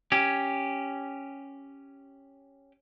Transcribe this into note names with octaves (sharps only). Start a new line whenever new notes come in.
C#4 G4